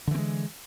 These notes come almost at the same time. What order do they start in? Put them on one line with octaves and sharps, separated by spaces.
D3 E3 C4 G#3